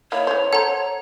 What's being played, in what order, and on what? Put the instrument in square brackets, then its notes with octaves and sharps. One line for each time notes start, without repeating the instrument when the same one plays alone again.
[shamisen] A#3 D#4 E4 [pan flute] C#5
[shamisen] E3 C5
[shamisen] A4 C5 [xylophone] F#5 A#5